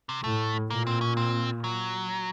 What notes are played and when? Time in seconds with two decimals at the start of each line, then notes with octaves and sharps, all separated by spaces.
0.09 C3
0.23 A2 A3
0.70 A#2 A#3
0.87 C4
1.01 C#4
1.17 C4
1.64 F#3